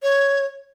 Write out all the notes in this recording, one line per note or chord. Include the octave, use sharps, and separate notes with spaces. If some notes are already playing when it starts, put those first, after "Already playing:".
C#5